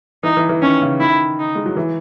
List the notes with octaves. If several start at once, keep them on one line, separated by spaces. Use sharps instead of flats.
E3 D#4
E3
E3
D#3 C#4
C#3
D#3 E4
D#4
G#3
F#3
E3